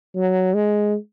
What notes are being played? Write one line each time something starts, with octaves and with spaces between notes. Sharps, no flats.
F#3
G#3